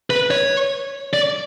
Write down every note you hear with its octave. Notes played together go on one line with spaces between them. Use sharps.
B4
C#5
D5